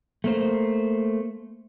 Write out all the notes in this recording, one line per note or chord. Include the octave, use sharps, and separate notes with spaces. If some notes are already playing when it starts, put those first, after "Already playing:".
A3 A#3 C5